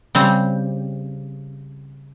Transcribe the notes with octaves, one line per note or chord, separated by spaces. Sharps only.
C#3 G3 C4